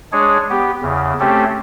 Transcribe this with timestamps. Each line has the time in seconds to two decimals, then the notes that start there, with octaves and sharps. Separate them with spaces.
0.12 G#3 D4 G#4 C#5
0.50 B3 G4
0.82 E2 C#3
1.20 A3 C4 C#4 G4 A4